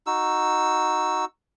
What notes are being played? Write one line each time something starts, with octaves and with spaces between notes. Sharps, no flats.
D#4 F#4 E6